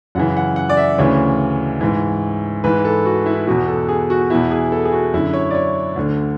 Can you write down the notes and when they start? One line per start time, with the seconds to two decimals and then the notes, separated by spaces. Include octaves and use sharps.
0.15 F#2 C#3 E3 F#5
0.37 F#5
0.56 F#5
0.70 D5
0.77 E5
0.98 D2 C#3 E3 C#5
1.81 G#2 E3
2.64 G#2 E3 B4
2.85 A4
3.05 F#4
3.26 E4
3.47 E2 B2 F#4
3.67 A4
3.89 G#4
4.10 F#4
4.30 E2 B2 E4
4.51 G#4
4.72 A4
4.85 G#4
4.92 F#4
5.14 F#2 D3 E4
5.34 C#5
5.50 D5
5.55 C#5
5.96 D2 D3